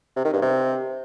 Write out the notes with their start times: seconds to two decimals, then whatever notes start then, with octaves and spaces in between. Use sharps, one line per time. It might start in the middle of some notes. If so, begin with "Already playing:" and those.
0.16 C3
0.25 D#3
0.33 G2
0.42 C3